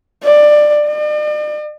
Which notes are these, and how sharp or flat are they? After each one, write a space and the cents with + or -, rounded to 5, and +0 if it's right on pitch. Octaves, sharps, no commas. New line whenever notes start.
D5 +15
D5 +45